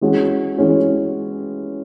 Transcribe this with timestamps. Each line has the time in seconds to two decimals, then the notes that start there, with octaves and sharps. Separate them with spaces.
0.01 E3 G#3 C#4 F#4
0.57 E3 G#3 C#4 F#4